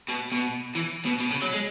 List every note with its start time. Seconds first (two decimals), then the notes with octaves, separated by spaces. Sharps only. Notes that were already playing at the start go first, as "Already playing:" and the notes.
0.08 B2
0.32 B2
0.75 E3
1.05 B2
1.20 B2
1.31 C#3
1.42 F#3
1.53 G#3